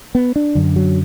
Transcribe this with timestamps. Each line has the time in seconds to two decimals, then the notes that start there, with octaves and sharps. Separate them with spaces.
0.15 B3
0.36 D4
0.55 F#2 D3
0.76 F#3